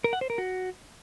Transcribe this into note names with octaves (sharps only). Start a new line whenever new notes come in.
A#4
F#5
C5
A#4
F#4